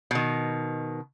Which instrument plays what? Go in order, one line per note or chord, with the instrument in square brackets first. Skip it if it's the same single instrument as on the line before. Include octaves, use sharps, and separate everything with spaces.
[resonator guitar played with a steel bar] B2 D#3